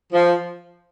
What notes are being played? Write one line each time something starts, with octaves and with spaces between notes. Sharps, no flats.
F3